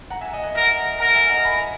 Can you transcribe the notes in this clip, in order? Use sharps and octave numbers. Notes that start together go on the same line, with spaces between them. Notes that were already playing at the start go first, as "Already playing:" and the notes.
F#5 A#5
E5 G#5
D#5 F#5
F#5
A#4 E5
D#5 F#5
A#4 F#5 A#5
E5 G#5
D#5 F#5
G#5 B5